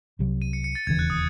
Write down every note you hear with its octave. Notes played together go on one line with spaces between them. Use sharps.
C2 C3 F#3
D#7
C#7
C#7
A6
E1 D#2 C#3 E3 G#6
F#6
D#6